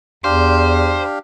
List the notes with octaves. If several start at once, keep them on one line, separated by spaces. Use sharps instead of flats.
E2 D4 G4 C5 F5